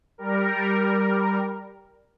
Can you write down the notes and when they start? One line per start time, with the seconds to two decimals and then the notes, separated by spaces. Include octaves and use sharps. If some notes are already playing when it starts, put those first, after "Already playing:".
0.18 G3 A#4